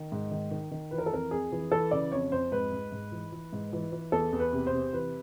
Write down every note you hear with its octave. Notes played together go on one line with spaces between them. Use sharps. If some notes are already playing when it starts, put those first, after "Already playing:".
Already playing: D#3
G#2
D#3
D#3
D#3
E3 B4
A#4
A4
F2 A#4
F2 G#4
E3
E3 A4
C#3 D5
F2 C#5
F2 C5
G#2 B4
G#2
G#2
E3
E3
G#2
E3
E3
E2 A4
E2
B4
C3
C5
C3
E3 B4